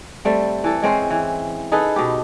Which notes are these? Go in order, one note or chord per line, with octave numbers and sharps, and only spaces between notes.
G3 A3 C4
E3 A4
G#3 C4 C#4 C5
E3
D#4 G#4 A4 B4
B2 G4